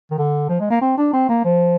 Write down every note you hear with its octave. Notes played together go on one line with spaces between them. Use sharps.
D#3
D3
F3
G#3
A#3
C4
D4
C4
A#3
F3